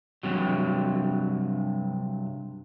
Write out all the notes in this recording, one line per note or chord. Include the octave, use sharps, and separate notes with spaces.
G2 C3 F#3